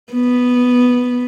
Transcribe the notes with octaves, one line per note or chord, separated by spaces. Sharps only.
B3